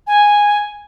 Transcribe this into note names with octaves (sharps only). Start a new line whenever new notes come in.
G#5